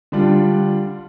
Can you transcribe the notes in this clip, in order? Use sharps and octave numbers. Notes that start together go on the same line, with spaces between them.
D3 G3 D4 F4